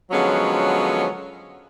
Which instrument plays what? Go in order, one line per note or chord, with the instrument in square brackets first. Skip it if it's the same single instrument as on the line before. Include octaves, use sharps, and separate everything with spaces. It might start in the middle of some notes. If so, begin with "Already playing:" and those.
[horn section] D3 F3 F#3 G#3 B3 C#4